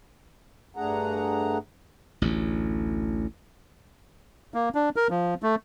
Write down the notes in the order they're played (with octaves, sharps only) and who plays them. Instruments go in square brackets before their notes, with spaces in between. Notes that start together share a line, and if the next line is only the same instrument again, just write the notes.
[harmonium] G2 A3 D4 G#4 F#5 A#5
[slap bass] A1 D2
[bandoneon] A#3
D4
A#4
F3
A3